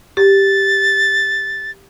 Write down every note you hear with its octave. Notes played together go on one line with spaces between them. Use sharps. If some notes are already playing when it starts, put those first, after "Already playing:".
G4 A6